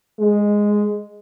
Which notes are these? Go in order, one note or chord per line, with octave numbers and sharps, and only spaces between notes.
G#3